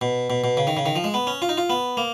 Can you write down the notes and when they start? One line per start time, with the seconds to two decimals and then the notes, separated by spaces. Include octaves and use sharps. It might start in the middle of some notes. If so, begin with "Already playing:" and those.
0.01 B2
0.30 B2
0.44 B2
0.57 C#3
0.67 D#3
0.77 C#3
0.86 D#3
0.96 F3
1.04 G#3
1.14 B3
1.27 C#4
1.42 F4
1.49 D#4
1.58 F4
1.70 B3
1.97 A#3